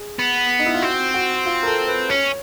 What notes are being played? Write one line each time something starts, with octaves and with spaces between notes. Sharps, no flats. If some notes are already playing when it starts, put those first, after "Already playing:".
Already playing: G#4
B3
D#4
E4
F4
C4 F#4
F#4
F4
A#4
A4
B4
C#4 C#5